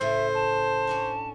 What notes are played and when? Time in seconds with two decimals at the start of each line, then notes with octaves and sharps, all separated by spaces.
0.01 A2 C#3 E4 C5 E5
0.33 A5
0.87 C#4 D4 F#4